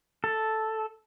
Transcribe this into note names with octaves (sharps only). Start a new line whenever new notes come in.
A4